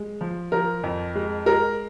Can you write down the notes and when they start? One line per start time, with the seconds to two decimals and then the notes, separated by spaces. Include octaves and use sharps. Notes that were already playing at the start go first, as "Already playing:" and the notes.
Already playing: G#3
0.21 F3
0.52 F3 A#4
0.83 F2
1.15 G#3
1.46 G#3 A#4